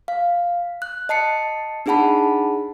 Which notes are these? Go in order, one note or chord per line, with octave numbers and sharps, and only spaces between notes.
F5
F#6
D#5 A5 C7 C#7
D4 D#4 G#4 F#5 A5 B5